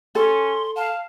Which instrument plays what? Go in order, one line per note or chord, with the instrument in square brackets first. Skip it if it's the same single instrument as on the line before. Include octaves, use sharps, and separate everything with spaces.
[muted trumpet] C#4 [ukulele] A4 [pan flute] C6
[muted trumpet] F5 [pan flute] A5